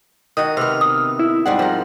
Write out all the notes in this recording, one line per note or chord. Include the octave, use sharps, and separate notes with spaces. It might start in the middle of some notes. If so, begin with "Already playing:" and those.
D#3 F#4 D#6
C3 B3 F6
D#6
E4
G#2 G3 G#4 F#5
F3 A#4